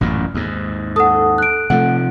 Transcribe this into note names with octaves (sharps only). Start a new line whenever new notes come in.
A1 F#2 A#2
D#2 G#2
A4 F#5 D#6
F#6 D7
C3 F3 A3 F#5